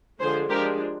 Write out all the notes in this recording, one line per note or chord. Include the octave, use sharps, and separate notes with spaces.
D3 F3 G#3 G#4 C5
F3 G#3 D4 G4 A#4